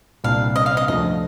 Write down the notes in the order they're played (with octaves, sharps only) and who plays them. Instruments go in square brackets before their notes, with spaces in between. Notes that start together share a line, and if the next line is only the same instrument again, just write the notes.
[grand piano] C2 A#2 G3 D4 [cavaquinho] F5
[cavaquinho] D#5
F5
D#5
[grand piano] D2 D3 F3 A3 [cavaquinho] D#5